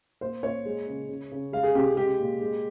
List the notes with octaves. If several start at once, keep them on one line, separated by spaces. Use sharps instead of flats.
A#2 C5
A#2 C#5
G#3
C#3
C#3
C#3
G#3 F5
G#4
C3 G4
G#3 G4
A#2
G#3